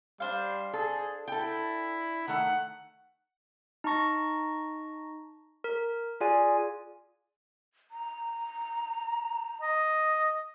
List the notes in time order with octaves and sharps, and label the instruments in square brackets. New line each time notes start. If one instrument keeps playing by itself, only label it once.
[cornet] G3 [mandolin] D4 C5 F5
[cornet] G#4 [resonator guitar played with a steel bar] A4
[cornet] E4 [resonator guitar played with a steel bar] A4 G5
[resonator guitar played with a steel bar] D#3 A3 [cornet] F#5
[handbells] D#4 A5 A#5 C#6 A#6
A#4
F4 G#4 D5 F5 G#5
[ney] A#5
[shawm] D#5